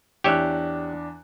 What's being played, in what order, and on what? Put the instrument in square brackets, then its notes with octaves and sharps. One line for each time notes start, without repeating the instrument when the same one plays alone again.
[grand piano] E2 D4 F#6 [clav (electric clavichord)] G4 C#5 E5